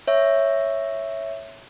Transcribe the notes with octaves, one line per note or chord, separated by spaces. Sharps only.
C#5 E5